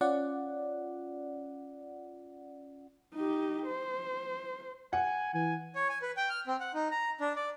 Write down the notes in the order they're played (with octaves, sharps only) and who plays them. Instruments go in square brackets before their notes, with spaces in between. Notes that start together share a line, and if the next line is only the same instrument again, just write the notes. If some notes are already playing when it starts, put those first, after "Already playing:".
[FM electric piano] C#4 F4 D5 F#5
[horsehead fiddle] D#4 G4
C5
[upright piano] F#5 [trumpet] G#5
[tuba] E3 [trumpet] G#5
[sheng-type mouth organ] C#5
G#5
B4
G5
F6
C4
F#5
D#4
A#5
D4
D5